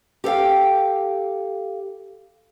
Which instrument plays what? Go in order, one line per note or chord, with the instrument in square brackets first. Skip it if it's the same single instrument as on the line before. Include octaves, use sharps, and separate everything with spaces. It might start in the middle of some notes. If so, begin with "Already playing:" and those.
[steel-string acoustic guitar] G4 A4 C5 F5 G5